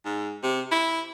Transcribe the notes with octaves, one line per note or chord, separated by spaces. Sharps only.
G#2
C3
E4